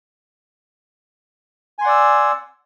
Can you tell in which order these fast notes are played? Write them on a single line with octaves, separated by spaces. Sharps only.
G#5 C6 F#5 D5 E6